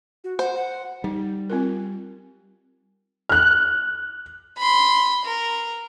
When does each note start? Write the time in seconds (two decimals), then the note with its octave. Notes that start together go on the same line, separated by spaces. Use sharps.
0.24 F#4
0.39 C5 F#5
0.55 F#5
1.04 G3 D#4
1.50 C4 F4 A#4
3.29 F6 F#6
4.58 B5 C6
5.25 A#4